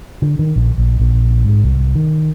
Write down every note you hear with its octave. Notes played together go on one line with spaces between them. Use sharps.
D3
D#3
A#1
A#1
A#1
G#2
C2
D#3